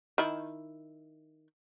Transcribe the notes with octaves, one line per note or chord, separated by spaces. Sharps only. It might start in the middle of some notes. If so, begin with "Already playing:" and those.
D#3 E4